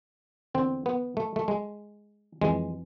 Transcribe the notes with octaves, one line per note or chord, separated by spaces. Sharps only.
E2 D3 C4
B3
A3
A3
G#3
F2 E3 G#3